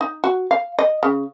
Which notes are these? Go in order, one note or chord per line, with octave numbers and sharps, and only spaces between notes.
D#4
F#4
F5
D#5
C#3